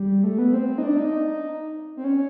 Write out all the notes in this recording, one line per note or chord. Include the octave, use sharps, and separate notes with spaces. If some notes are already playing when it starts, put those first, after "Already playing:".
Already playing: G3
A3
B3
C4
D#4
D4
D#4
C4
C#4